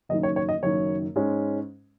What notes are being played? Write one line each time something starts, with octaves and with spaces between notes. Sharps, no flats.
F#1 F#2 D#3 D#5
C#5
C#5
D#5
F#1 F#2 D#3 C#5
G#2 G#3 C#4